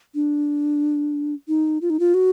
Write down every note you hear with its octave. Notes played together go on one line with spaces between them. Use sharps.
D4
D#4
F4
D#4
F4
F#4